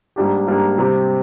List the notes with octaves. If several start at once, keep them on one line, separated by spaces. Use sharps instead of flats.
G#2 G3 A#3 D4 G4
G#2 G3 A#3 D4 G4
C3 G3 C4 G4